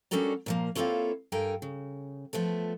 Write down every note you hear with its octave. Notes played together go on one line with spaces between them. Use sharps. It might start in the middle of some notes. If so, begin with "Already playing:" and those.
G3 C#4 D4 F#4 A4 A#4
A#2 F3 A#3
A#3 C4 E4 F4 A4 C#5
G2 A4 A#4 G5 G#5
C#3
F3 A3 B3 A4